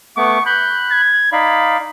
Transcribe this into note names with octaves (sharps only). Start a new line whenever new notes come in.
A3 B3 C#6 D6
B5 F#6 G6
G#6
D#4 D5 F5 B5